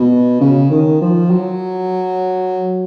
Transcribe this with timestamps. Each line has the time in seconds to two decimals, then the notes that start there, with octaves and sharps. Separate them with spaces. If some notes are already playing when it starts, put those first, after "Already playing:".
Already playing: B2
0.41 C#3
0.71 D#3
1.01 F3
1.30 F#3